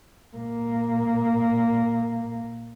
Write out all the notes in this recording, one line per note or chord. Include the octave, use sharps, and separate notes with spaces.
A#2 A#3